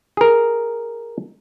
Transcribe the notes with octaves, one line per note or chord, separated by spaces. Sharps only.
G#4 A#4